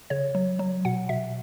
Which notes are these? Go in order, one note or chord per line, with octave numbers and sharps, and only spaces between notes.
C#3 C#5
F#3
F#3
B2 F#5
B2 E5